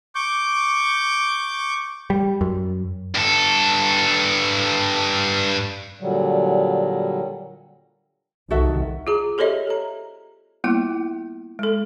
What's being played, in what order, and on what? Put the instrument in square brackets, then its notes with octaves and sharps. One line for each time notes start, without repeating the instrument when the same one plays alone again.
[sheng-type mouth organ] C#6 D6 G6
[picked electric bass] G3
F#2
[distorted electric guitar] G2 A4
[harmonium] A#2 D3 F#3 G3
[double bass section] C2 D#3 [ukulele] F#4 A4 E5
[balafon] F4 G#4 A#5
G4 A4 C5 C#5 D#5 E5
A4 A#5
G3 A#3 B3 E4 F4 F#5
G#3 A4